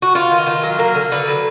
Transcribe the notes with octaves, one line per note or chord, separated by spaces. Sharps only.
F#4
B3 F4
D#3
D#3 F4
F#3
A#3 A#4
D3
D3 B4
F#3